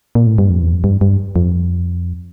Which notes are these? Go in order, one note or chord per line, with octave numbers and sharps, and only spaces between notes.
A#2
A2
G2
F2
E2
F2
G2
G2
F2